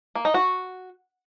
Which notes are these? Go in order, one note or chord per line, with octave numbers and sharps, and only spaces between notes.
A#3
D#4
F#4